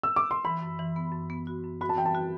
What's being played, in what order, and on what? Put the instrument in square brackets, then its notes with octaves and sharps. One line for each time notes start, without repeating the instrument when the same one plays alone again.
[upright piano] E6
D6
C6
[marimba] E3 [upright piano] B5
[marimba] F#2
E3
B3
F#2
B3
F#4
F#2
[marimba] F#4 [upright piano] B5
[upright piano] A5
[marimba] E3 [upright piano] G5
[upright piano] A5
[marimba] F#4